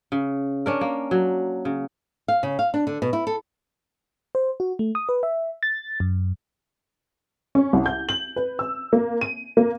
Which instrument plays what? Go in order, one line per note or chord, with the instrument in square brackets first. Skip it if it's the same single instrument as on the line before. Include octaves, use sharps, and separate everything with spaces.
[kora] C#3
C#4 D4 A#4
A#3
F#3
C#3
[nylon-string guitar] F5
C#3
F5
D4
D3
B2
E4
A4
[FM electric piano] C5
F#4
A3
D#6
B4
E5
A6
F#2
[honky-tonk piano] C#4
C2
G6
F#7
B4
E6
A#3
D#7
A#3